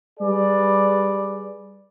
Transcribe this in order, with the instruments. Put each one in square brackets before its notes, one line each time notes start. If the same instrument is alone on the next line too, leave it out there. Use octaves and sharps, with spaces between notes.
[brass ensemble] G3 G#4 B4 D5